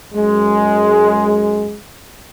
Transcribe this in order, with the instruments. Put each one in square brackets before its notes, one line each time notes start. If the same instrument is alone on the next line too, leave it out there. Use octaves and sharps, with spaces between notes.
[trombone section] F#2 G#3